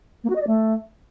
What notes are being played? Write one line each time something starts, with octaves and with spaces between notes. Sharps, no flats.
A#3
F#4
D#5
D5
A3